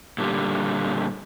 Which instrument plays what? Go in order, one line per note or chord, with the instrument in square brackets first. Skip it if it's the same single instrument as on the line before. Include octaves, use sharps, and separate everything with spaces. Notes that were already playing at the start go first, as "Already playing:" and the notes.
[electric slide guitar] A#2 D3 G3